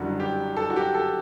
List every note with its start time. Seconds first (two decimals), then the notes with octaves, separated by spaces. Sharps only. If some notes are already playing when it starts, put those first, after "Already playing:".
Already playing: F#1 F#2 D3 G3 F#4
0.20 G4
0.57 A4
0.70 F#4
0.76 G4
0.94 A4